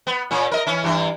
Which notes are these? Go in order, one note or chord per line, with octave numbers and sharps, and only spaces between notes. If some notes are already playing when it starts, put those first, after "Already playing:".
B3
A#2 C#4
A#4 D#5
E3 C#4
G2 E3